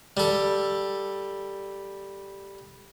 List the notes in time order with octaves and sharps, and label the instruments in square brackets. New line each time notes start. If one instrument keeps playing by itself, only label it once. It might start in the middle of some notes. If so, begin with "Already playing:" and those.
[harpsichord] G3 A4